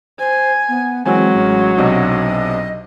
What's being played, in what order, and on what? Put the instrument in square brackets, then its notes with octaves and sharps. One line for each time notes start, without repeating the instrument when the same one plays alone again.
[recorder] C5 [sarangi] G#5
[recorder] B3
[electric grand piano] E3 C4 G#5 [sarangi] F#3 [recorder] G#3
[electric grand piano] A1 C#4
[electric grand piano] B1 C3 D4 [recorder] D#5